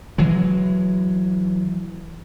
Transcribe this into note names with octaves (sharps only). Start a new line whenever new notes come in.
E3 F#3 G#3